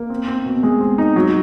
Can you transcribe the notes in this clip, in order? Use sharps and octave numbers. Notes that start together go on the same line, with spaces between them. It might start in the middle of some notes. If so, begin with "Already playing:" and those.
Already playing: A#3
C4
C4
B2
G#3
C4
D#4
F#3